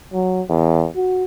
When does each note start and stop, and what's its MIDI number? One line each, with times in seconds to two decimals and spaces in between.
0.13 0.42 54
0.49 0.87 40
0.95 1.25 66